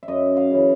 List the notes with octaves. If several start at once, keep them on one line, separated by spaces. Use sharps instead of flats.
E5
F#2 D#5
F5
C#3 E3